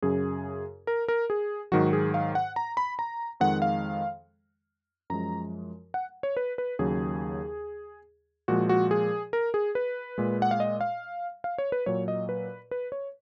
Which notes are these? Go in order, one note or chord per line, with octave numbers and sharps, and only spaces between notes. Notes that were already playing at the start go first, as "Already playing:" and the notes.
F#2 C#3 F#3 G#4
A#4
A#4
G#4
G#2 D#3 F#3 F#4
G#4
F5
F#5
A#5
B5
A#5
F2 D#3 G#3 F#5
F5
F#2 F3 G#3 A#5
F#5
C#5
B4
B4
D#2 C#3 F#3 G#4
A#2 F3 G#3 F#4
F#4
G#4
A#4
G#4
B4
A#2 G#3
F#5
F5
D#5
F5
F5
C#5
B4
A#2 F#3 C#5
D#5
B4
B4
C#5